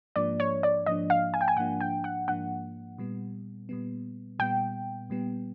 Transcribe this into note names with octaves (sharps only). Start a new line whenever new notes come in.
G#2 F3 A#3 D4 D5
C#5
D5
G#2 F3 A#3 D4 D#5
F5
G#5
G5
G#5
G#2 F3 A#3 D4 F#5
G5
F#5
G#2 F3 A#3 D4 F#5
A#2 G3 B3
A#2 G3 B3
A#2 G3 B3 G5
A#2 G3 B3